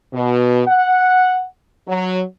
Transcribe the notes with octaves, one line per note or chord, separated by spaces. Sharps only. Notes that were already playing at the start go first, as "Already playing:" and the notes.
B2
F#5
F#3